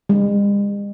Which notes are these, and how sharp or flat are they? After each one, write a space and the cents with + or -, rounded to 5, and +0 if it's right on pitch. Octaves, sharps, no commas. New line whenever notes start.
G#3 -45